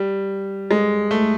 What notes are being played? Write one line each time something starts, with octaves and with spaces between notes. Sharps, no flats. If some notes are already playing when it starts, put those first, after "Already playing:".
Already playing: G3
G#3
A3